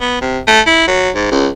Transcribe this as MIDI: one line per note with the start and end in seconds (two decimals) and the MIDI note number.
0.01 0.20 59
0.21 0.39 48
0.47 0.60 57
0.66 0.86 64
0.87 1.09 54
1.15 1.29 44
1.31 1.48 37